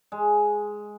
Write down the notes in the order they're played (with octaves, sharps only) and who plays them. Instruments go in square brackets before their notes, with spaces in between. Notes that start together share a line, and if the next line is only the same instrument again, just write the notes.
[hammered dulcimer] G#3